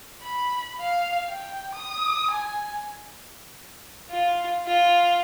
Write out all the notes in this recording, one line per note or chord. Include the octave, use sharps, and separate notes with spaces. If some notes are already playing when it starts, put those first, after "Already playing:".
B5
F5
G5
D#6
G#5
F4
F4